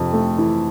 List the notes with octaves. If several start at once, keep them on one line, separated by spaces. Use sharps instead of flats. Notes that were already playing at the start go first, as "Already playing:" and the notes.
Already playing: F2 C3
A3
E3